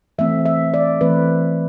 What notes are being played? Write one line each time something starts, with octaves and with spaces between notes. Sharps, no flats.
E3 A3 C4 E5
E5
D5
E3 A3 C4 B4